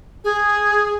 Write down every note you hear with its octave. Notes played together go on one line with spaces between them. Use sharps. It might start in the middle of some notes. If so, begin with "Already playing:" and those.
G#4